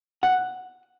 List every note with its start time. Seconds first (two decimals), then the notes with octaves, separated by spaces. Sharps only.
0.23 F#5